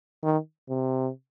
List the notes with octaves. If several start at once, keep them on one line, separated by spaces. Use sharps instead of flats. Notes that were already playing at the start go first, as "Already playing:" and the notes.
D#3
C3